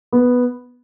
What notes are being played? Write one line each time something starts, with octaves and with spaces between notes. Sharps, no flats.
B3